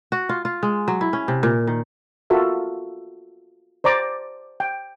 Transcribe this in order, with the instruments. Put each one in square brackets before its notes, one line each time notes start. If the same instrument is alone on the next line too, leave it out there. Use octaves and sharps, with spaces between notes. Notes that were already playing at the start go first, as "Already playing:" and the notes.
[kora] F#4
F4
F4
G#3
F#3
E4
C#4
C3
A#2
D#3
[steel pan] F4 F#4 A4 A#4 E5
C5 D5 A#5 D6
G5